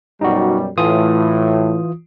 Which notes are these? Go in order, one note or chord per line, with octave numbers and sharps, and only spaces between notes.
F#2 B2 G3 D#4 F#4
A2 E3 F4 D#6